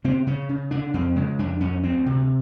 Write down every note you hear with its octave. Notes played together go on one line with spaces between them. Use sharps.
C#3 C4
C#3 C#4
C#3
C#3 D4
F2 C4
C#3 G#3
F2 D4
F2 C#4
D2 C4
C3